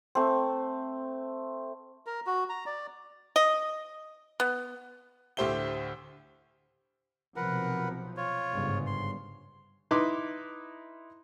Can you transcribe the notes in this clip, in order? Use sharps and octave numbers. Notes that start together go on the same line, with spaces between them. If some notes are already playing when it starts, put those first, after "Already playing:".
A3 C4
A#4
F#4
A#5
D5
D#5
B3
D2 A2 G4 C5 E5 G7
B1 C3 F3 A#4 B4 F#5
F4 C#5
G1 G#2 C#3
C6
D#4 E4 B4 C6 D6